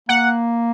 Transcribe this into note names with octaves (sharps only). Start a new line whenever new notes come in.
A#3 F#5